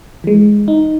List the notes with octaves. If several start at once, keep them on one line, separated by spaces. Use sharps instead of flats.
E3 G#3
D#4